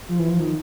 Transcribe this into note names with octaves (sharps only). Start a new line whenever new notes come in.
F3
E3
F3
D#3